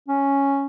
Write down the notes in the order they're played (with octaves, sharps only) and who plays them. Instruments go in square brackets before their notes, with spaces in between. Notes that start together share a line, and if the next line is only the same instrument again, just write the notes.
[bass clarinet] C#4